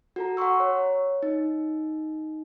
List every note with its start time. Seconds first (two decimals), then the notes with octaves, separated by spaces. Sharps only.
0.16 F#4 A4 A#5
0.37 F#5 A#5 C6 C#6 E6
0.60 C#5
1.23 D#4